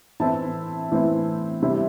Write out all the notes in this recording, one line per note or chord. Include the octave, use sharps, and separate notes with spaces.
A2 E3 A3 C4 E4 A5
A2 E3 A3 C4 E4
C3 G3 C4 E4